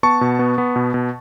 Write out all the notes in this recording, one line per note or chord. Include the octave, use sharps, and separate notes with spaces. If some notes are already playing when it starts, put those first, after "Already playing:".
B3 A5 C#6
B2
B3
B3
B2
B2